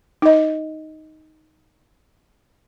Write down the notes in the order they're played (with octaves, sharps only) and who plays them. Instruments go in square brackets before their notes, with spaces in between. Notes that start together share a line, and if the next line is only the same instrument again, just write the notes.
[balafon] D#4 D#5